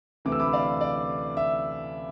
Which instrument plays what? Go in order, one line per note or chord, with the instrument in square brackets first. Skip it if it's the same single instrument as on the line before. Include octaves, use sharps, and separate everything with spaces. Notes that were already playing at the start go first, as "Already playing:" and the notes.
[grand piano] D2 C3 E3 A3 D6
E6
B5 D6
D5 F5
D5
E5